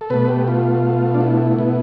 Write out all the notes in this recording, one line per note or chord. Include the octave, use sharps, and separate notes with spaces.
A4
B2 A3 B4
G4
F4
D4
E4
B2 B3